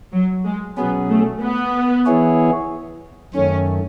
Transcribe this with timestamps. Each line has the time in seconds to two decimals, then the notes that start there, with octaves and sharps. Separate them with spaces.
0.12 F#3
0.45 G#3
0.77 B2 F#3 B3 C#4 G#4
1.09 A3
1.41 B3
2.06 E3 B3 E4 G#4 C#5
3.34 F#2 D#3 A3 C#4